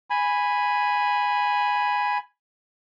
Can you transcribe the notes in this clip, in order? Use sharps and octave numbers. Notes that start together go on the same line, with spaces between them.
G#5 B5